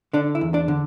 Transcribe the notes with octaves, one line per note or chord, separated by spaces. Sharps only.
D3 D4
E4
E2
D4
D3